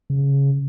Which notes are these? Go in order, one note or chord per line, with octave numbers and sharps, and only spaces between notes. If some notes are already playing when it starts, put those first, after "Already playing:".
C#3